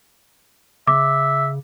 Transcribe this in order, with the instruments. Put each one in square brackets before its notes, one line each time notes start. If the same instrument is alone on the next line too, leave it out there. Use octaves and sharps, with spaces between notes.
[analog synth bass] C#3 [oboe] E5 [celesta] D6